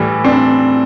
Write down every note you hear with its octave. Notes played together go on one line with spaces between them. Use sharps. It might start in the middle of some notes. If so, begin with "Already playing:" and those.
Already playing: A2 E3 G3
C4 D4